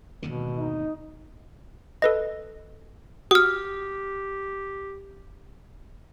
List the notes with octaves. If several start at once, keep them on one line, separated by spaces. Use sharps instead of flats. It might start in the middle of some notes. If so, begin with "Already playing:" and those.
G#1 D#2 B2 D3
D#4
A4 B4 D#5
F#4 G4 D#6 F6